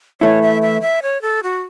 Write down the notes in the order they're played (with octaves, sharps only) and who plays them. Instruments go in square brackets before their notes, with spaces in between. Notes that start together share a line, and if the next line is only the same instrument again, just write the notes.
[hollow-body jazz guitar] E3 A3 E4 [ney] C#5
[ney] E5
E5
E5
C#5
A4
F#4